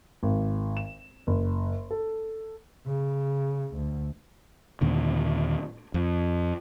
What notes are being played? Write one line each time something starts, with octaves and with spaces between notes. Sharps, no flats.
G#1
E7
F#1
A4
C#3
D2
D#2 A#2 D3
F2